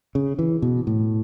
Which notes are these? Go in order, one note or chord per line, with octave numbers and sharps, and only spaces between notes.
C#3
E3
B2
A2